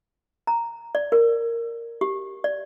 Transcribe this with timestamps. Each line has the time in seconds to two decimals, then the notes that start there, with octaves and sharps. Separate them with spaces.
0.47 A#5
0.95 D5
1.12 A#4
2.01 G4
2.44 D5